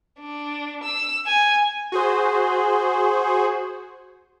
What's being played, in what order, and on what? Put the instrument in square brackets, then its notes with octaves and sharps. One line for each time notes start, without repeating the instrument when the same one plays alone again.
[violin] D4
E6
G#5
[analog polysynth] F#4 G#4 C5